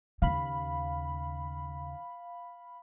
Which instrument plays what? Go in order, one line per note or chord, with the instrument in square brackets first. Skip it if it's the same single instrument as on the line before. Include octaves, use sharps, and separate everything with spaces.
[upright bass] D#2 C#3 [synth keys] F5 B5